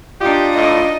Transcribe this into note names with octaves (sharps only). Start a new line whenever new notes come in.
D4 D#4 F4 G4
A2 D#5